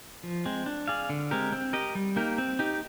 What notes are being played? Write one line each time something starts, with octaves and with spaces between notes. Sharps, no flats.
F3
G#3 C4
D4
G#4 D5 F5
D3
G#3 C4 G4 A#4
C4
G4 A#4 D#5
G3
A#3 D#4 G4 A#4
C4
D#4 G4